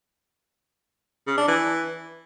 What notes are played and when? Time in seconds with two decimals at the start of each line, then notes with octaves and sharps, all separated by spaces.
1.27 C#3
1.37 D4
1.48 E3